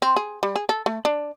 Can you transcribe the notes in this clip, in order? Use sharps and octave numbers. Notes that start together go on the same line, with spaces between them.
C4
G#4
G3
G#4
A4
A3
D4